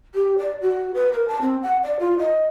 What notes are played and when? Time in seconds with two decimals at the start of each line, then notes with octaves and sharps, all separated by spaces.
0.15 G4
0.38 D5
0.62 F#4
0.94 B4
1.13 A#4
1.28 A5
1.41 C4
1.62 F#5
1.83 D5
1.99 F4
2.19 D#5